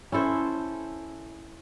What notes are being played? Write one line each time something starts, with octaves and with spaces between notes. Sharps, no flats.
C#4 E4 A4 C5